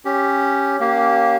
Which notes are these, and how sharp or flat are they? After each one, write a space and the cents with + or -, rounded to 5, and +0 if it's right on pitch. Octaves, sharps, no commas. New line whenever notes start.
C#4 +0 G4 +0
A#3 +0 C#4 +0 G4 -25